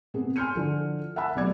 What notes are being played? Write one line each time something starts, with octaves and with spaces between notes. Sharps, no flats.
C3 B3 G#4
G#5 C6 F6 G6 C#7 D#7
D3 F3 E4
E5 F#5 G#5 A5 B5 E6
F1 B2 F#3 D5 D6 G#6